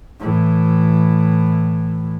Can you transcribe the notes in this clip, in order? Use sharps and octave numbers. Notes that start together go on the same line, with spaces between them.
A2 E3